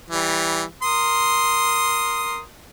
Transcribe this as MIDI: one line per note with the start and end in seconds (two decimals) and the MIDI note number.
0.11 0.62 52
0.11 0.62 55
0.82 2.41 70
0.82 2.41 84
0.82 2.41 87